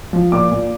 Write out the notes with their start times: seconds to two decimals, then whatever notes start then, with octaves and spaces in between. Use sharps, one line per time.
0.13 F3
0.32 A#2 D6
0.51 A#2